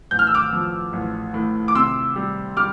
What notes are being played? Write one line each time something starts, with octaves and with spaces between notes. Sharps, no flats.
A1 G6
F6
E6
D6 F6
F3
A1
A2
D6
C3 C6 E6
G3
G3 D6 F6